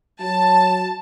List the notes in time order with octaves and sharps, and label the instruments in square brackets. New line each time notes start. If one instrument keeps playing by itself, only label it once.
[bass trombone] F#3 [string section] A5